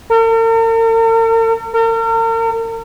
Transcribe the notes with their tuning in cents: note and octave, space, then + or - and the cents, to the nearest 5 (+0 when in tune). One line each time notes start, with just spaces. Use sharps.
A#4 -45
A#4 -40